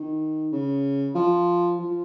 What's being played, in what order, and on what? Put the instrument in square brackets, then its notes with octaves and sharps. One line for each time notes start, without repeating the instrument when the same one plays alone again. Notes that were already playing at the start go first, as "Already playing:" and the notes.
Already playing: [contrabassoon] D#3
C#3
F3
F3